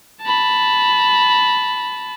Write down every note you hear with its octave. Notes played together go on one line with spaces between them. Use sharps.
A5 B5